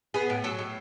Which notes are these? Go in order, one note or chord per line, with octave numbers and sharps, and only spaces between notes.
B3 G#4
A2
F#3 A4
A2